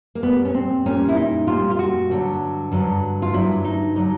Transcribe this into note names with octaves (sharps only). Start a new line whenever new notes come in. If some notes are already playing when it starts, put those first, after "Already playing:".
A#3
A#2 G3 B3
C#4
C4
A#2 G3 C#4
E4
D#4
A#2 G3 F4
F4
F#4
G2 D3 F#3
G2 D3 F#3
F4
G2 D3 F#3 E4
D#4
D3 F#3 D#4